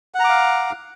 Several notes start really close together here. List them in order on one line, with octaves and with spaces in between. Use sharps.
F#5 A#5 D6 F5